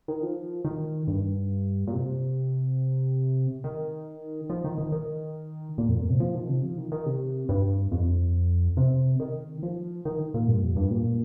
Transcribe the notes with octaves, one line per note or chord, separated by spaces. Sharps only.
D#3
F3
D#3
G2
A#2
C3
D#3
F3
D#3
D#3
D#3
A#2
F2
A#2
C3
F3
D#3
C3
F3
D#3
D#3
C3
G2
F2
C3
D#3
F3
D#3
A#2
G2
F2
G2
A#2